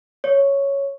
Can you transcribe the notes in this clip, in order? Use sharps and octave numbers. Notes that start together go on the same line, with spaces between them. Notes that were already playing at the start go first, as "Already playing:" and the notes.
C#5